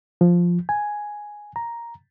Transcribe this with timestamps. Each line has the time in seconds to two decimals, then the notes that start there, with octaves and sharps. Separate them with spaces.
0.21 F3
0.69 G#5
1.56 A#5